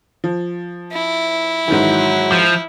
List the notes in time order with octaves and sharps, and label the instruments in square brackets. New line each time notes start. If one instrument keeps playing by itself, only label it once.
[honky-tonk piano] F3
[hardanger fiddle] E4
[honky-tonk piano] G#2 D#3 E3 [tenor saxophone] F#3
[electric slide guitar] F3